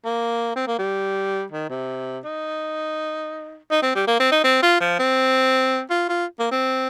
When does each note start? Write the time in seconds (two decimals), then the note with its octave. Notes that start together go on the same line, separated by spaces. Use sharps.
0.05 A#3
0.56 C4
0.67 A#3
0.78 G3
1.52 D#3
1.69 C3
2.25 D#4
3.71 D#4
3.83 C4
3.95 G3
4.07 A#3
4.20 C4
4.32 D#4
4.44 C4
4.63 F4
4.81 F3
4.99 C4
5.90 F4
6.09 F4
6.39 A#3
6.51 C4